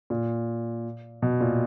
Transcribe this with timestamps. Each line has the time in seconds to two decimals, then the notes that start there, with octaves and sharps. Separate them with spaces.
0.10 A#2
1.22 B2
1.41 A#2